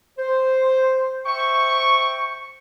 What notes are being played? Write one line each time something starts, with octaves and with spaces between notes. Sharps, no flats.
C5
C5 E5 G5 C#6